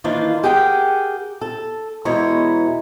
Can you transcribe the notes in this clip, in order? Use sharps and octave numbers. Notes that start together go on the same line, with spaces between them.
D#3 E3 A#3 D4 F4
G4 G#4 A#4 F#5 G5
A4
E2 B2 G#3 E4 C#5 A#5